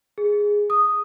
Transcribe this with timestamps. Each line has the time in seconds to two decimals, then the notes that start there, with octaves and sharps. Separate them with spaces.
0.18 G#4
0.70 D#6